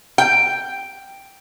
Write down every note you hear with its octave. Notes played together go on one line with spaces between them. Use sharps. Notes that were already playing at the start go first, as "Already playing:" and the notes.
G5